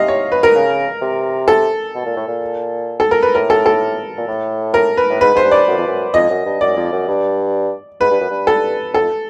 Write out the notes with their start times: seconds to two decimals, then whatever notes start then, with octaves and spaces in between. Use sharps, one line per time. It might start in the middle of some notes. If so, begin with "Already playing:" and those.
Already playing: C3 D#5 F5
0.08 C#5
0.32 B4
0.43 A#4
0.55 C#3
1.02 C3
1.48 A4
1.95 B2
2.06 A#2
2.16 A2
2.28 A#2
3.00 A4
3.11 A#4
3.23 B4
3.35 A2 A#4
3.50 A4
3.66 A4
4.18 A#2
4.28 A2
4.74 A#4
4.97 B4
5.10 A2
5.21 G#2 B4
5.34 G#2 C5
5.44 G2
5.52 D5
5.68 F#2
5.77 F2
5.87 F#2
6.14 F2 D#5
6.30 F#2
6.46 G2
6.61 F#2 D5
6.77 F2
6.92 F#2
7.08 G2
8.01 G#2 B4
8.10 G2
8.20 F#2
8.30 G2
8.47 A4
8.94 F#2 A4
9.01 F2